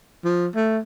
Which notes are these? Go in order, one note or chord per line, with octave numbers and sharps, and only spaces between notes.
F3
A3